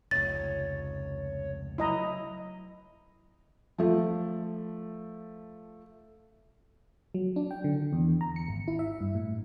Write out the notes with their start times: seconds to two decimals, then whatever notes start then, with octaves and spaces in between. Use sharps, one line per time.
0.11 F1 C#2 C#5 A6
1.78 F#3 E4 D#5 A#5
3.78 F3 A3
7.14 F#3
7.36 D4
7.51 G5
7.64 D3
7.93 E2
8.21 A#5
8.36 C#7
8.48 G#1
8.68 E4
8.79 E5
9.01 G2
9.15 A2